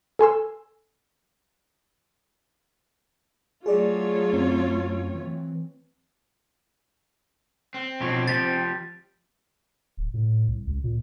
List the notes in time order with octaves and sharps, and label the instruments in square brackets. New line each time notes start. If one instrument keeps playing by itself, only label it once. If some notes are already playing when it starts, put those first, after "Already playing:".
[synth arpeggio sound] A4 G#5 C6 E6
[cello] F#3 A3 [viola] F4 C#5 [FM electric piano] G#4 D5
[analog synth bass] F#2 [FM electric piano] C4
[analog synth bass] E3
[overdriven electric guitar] C4
[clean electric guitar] B2 F3 C#5
[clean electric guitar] F3 G4 [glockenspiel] A6
[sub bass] D1
A2
C2
C#2
A#2